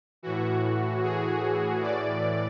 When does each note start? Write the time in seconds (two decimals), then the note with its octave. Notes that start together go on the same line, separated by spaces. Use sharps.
0.23 A2 E3 F#4
1.03 G#4
1.81 A2 E3 D5